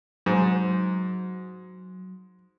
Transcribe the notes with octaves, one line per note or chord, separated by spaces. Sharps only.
G#2 F#3